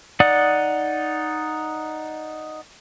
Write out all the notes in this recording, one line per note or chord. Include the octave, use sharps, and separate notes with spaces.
D#4 D5 F#5 D#6